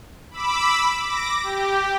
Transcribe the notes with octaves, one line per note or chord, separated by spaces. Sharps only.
B5 D6 E6
D6 A#6
G4